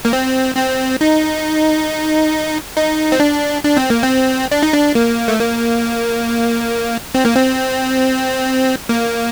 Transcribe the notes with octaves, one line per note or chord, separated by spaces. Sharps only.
A#3
C4
C4
D#4
D#4
C4
D4
D4
C4
A#3
C4
D4
D#4
D4
A#3
A3
A#3
C4
A#3
C4
A#3